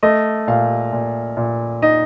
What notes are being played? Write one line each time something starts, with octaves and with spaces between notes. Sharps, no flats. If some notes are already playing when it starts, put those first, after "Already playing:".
A3 D#5
A#2 F5
A#2
A#2
D#4 D#5